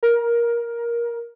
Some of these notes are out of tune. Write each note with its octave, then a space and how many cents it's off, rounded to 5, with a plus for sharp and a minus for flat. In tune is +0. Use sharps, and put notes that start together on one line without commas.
A#4 +15